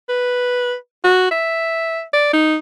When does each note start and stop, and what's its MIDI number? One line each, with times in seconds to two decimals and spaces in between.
0.09 0.75 71
1.04 1.30 66
1.31 2.02 76
2.13 2.31 74
2.33 2.56 63